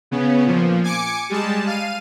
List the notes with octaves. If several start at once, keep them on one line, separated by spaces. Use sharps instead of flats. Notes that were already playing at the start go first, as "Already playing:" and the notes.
C#3 B3 C#4
A#2 F3
G#5 D6 C#7
G3 G#3 A5
F5 D#7